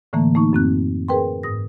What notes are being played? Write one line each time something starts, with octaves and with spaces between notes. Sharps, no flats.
A2 D3 E3 A3 A#3
A3 A#3 D#4 C#6
F#2 C4 F#6
G#4 A#4 B4 G5 C6
G#2 D#6 A#6